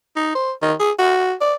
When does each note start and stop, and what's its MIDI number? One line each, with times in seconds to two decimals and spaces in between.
0.16 0.31 63
0.35 0.52 72
0.62 0.74 51
0.80 0.91 68
0.99 1.33 66
1.41 1.55 74